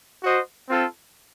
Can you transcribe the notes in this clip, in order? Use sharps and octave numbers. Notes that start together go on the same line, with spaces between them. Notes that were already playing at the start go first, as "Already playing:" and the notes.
F#4 C5 D#5
C4 F4 A4